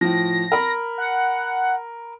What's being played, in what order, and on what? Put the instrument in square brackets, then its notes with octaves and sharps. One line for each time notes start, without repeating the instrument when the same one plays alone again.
[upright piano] A2 F3 [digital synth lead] A#6
[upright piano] A#4 B5
[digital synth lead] F#5